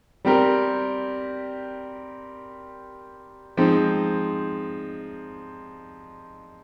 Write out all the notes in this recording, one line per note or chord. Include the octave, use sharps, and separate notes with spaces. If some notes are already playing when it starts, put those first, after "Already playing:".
G3 C4 G4 A#4
F3 G#3 C4 D#4